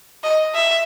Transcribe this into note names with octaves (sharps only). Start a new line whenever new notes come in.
D#5
E5